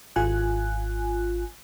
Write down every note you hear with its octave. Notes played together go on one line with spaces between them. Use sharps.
G#1 F4 G#5 F#6